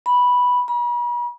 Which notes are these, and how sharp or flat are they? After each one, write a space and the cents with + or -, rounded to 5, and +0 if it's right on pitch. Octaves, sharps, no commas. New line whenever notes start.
B5 -5
B5 -45